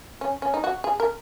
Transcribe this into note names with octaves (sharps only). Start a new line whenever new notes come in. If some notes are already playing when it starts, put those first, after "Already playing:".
C#4
C#4
D#4
F#4
G#4
A#4